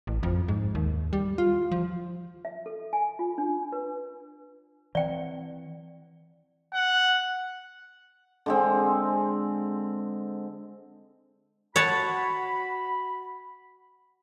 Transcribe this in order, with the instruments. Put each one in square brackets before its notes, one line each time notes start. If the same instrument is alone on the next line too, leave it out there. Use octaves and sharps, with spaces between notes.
[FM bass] A1
F2
G#2
D#2
G3
F4
F3
[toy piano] E5
A4
G#5
F4
D4
B4
[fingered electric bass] E3 C4 [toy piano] D5 G5
[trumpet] F#5
[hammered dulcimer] D3 G#3 C4
[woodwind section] F#4 B5 [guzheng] C#5 F#5 A5